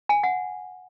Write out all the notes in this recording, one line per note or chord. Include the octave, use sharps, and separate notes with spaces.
G#5
F#5